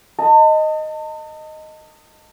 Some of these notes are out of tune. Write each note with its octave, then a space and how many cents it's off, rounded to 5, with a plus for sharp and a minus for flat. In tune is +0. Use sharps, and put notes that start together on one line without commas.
D#5 +0 A5 +40